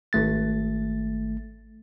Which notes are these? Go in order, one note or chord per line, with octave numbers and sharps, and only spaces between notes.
G#1 A3 A6